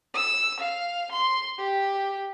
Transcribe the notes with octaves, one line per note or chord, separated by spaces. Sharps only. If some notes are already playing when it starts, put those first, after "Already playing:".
E6
F5
C6
G4